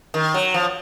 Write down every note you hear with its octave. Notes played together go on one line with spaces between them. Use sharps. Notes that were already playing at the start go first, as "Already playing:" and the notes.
D#3
F#3
F3